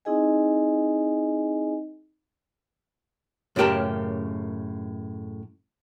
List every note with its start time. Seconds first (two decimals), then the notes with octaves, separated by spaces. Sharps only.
0.05 C4 D#4 E4 G#4 D#5 G#5
3.56 F#2 A2 C#3 G4 A#4 A5